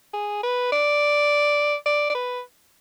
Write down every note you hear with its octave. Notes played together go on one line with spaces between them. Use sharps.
G#4
B4
D5
D5
D5
B4